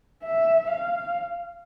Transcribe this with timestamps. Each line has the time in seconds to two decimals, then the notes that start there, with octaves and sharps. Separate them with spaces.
0.24 E5
0.70 F5